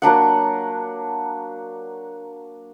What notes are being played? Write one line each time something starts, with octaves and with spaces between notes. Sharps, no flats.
F#3 A#3 D4 F#5